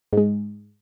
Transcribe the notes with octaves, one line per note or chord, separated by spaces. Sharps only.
G#2 G#3